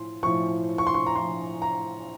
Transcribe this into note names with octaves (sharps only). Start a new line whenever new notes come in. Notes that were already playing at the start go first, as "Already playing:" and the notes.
Already playing: A2 F3 C6
A2 F3 C#6
C#6
C6
C#6
A#5
A2 F3 C6
A#5